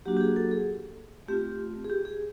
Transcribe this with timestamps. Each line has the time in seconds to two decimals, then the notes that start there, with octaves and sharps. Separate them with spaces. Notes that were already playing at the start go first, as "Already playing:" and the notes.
0.06 F#3 A#3 D4 F#4 G4
0.17 G4
0.21 G#4
0.36 A4
0.51 G#4
1.28 A3 C4 F4 G4
1.84 G#4
1.90 G4
2.05 G#4